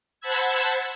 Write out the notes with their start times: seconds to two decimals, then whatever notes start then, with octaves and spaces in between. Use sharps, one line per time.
0.20 C5 F#5 A5 B5 E6 G#6